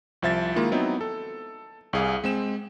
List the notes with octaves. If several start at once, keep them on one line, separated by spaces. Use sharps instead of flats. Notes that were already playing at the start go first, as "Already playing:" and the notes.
C2 F3 E5 A6
D#3 G#3 A#3 E4 F4
F#3 B3 C4 D#4 E4
A4
C2 G#4 F5
G#3 C4 E7